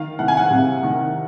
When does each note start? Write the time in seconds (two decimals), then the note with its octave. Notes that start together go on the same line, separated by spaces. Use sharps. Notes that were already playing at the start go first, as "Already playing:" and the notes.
Already playing: D#3 F5
0.19 C2 F#5
0.28 G#5
0.37 F#5
0.51 C3
0.83 D#3